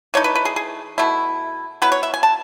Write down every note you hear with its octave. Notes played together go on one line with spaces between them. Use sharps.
E3 A3 D#4 C#5
B4
B4
G#4
G#4
B2 A3 E4
F#3 B3 E4 B4
C#5
E5
G#5
A5